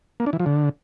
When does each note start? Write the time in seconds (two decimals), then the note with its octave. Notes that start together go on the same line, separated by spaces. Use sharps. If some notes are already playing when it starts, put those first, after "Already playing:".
0.20 A#3
0.26 D4
0.33 E3
0.40 F3
0.46 D3